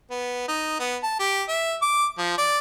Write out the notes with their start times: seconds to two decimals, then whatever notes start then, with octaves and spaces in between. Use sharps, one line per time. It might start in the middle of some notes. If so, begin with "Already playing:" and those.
0.10 B3
0.48 D#4
0.79 B3
1.03 A5
1.19 G4
1.48 E5
1.82 D6
2.18 F3
2.38 D5